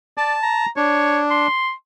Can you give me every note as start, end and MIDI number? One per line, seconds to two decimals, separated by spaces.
0.18 0.35 74
0.18 0.66 81
0.43 0.69 82
0.77 1.47 62
0.77 1.20 73
1.31 1.72 84